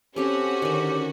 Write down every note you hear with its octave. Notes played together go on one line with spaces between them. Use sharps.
C4 C#4 F#4 G4 A4 C#5
D3 D#3